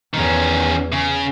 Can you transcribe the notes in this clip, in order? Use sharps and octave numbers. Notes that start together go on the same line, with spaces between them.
E2 D#3 C#4
C#3